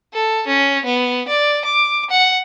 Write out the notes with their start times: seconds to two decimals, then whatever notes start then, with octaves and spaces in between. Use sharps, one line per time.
0.14 A4
0.47 C#4
0.85 B3
1.28 D5
1.65 D6
2.10 F#5